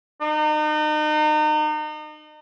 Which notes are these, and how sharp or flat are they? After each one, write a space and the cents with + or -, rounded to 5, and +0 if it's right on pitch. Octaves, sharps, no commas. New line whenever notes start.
D#4 -35